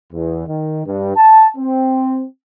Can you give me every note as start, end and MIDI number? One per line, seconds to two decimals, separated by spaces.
0.13 0.46 40
0.47 0.84 51
0.86 1.14 43
1.16 1.49 81
1.57 2.25 60